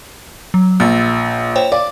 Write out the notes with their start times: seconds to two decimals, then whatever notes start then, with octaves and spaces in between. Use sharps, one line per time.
0.54 F#3
0.80 A#1 E6 A6
1.56 C5 C#5 G5
1.72 D5 F5